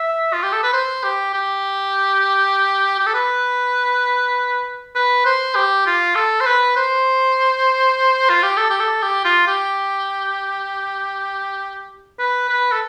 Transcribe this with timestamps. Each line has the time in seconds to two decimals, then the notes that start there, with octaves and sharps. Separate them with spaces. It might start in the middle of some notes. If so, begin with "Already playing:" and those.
Already playing: E5
0.33 F4
0.43 G4
0.53 A4
0.63 B4
0.73 C5
1.04 G4
1.34 G4
2.99 G4
3.06 A4
3.14 B4
4.95 B4
5.25 C5
5.55 G4
5.86 F4
6.15 A4
6.41 C5
6.46 B4
6.76 C5
8.30 F4
8.43 G4
8.57 A4
8.70 G4
8.80 A4
9.02 G4
9.25 F4
9.47 G4
12.19 B4
12.49 B4
12.72 A4